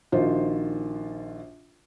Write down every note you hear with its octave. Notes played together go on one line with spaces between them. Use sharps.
A#1 D#3 D#4 F4 F#4 C5